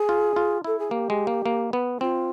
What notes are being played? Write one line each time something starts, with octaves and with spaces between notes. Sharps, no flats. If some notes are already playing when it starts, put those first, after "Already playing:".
Already playing: G#4
F4
F4
E4 A4
G#4
A#3 G4
G#3
A#3
A#3
B3
C4 F4